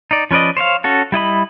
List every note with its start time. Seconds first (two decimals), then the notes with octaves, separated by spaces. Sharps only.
0.11 D#4 D5
0.31 F3 C#4 B4 D5 D#5
0.57 C5 C#5 E5 F5
0.84 C#4 F#4 A4
1.12 G3 E4 D#5 B5